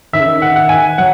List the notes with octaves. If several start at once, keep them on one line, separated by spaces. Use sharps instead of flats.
D#3 E5
C#3
D#3
F#5
F#5
G#5
F#3 F#5